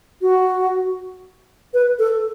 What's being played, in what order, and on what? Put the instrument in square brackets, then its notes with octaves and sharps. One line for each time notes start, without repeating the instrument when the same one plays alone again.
[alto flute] F#4
B4
A4